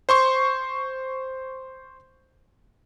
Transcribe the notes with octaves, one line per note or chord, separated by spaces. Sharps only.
C5 C6 C#6